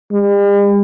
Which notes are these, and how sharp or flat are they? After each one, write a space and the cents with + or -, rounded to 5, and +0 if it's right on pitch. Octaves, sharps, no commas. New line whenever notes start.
G3 +45